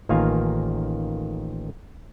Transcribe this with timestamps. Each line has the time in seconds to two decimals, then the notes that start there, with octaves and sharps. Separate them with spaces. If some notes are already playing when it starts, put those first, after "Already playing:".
0.09 A1 D#3 A#3 F4 F5 G#5